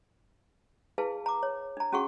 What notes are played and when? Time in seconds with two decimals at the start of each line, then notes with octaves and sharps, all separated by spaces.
0.98 E4 G#4 B4 F5 A5
1.26 A#5 D6
1.43 C#5
1.77 D4 A#5
1.92 C#4 F#4 G#4 F#5 C#6